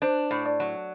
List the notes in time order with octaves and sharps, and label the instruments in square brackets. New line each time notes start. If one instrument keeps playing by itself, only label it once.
[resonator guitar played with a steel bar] D4 [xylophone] C5
[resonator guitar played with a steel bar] A2
[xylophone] D5
[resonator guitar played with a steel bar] F#3